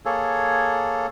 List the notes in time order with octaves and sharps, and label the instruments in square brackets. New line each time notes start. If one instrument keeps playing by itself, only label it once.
[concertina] A#3 G#4 A4 C#5